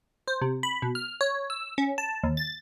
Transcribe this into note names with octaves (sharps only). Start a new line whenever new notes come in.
C5
C3
B5
B2
F6
C#5
E6
C#4
A5
D#2
A6